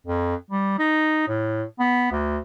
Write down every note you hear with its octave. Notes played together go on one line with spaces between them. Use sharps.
F2
G3
D#4
A2
B3
D2